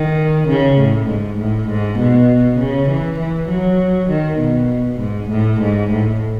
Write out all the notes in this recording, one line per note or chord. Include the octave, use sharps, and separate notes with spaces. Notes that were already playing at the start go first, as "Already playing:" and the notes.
Already playing: D#3
C#3
A2
G#2
A2
G#2
B2
C#3
E3
E3
F#3
D#3
B2
G#2
A2
G#2
A2